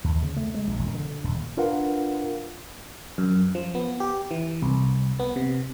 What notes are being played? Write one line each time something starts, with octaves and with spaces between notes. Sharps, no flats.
D#2
C#3
A3
G#3
A#1
E1
D3
D#1
D4 F4 A#4 B4 F5 F#5
F#2
F3
B3
G4
E3
C2
B3
C3